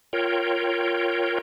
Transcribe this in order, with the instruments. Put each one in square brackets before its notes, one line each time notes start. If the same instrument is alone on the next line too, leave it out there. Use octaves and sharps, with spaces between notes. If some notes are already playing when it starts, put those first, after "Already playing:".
[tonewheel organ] F4 A#4 C#5 G5